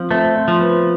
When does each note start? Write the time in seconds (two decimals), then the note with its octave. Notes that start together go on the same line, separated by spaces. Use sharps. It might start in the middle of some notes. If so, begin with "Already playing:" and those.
Already playing: F3 C4
0.10 A3 C4 C5
0.36 C4 C5
0.48 F3
0.60 B3 B4